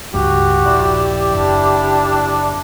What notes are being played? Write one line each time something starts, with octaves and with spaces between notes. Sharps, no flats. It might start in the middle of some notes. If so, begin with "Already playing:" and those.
C#2 G2 F#4 G4
D#1 A#1 E4 D5
F#1 D4